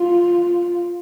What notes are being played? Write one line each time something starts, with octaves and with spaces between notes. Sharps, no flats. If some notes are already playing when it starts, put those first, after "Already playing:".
Already playing: F4